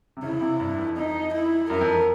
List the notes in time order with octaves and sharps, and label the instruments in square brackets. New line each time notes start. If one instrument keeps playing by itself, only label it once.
[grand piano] C3
[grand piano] C#3 [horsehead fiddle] E4
[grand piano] C3
G2
F2
[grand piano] F2 [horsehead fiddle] D#4
[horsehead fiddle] E4
[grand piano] F#2 [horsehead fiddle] A#4
[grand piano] F2